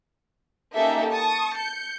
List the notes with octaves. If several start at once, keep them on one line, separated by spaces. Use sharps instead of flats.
A#3 C#4 D#4 G4 A4 E5
A5 C#6 D#6
G6 C#7